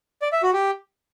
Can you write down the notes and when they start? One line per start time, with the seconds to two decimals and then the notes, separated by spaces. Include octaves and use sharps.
0.22 D5
0.32 E5
0.43 F#4
0.53 G4